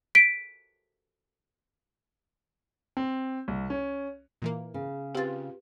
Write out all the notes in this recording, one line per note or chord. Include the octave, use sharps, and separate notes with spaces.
B6 D7
C4
C2
C#4
A#2 E3 A#3
C#3
C4 F4 G4 B4